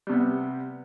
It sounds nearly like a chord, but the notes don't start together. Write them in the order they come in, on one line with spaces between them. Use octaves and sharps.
G3 C3 B3